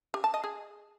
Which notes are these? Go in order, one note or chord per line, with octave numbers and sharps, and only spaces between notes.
G4
A5
D#5
G#4